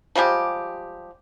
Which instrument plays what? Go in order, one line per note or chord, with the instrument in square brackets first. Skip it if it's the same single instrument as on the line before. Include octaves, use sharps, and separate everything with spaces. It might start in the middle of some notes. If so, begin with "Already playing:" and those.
[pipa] F3 G3 G#3 G4